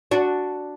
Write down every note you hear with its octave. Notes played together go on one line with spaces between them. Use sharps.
D4 F#4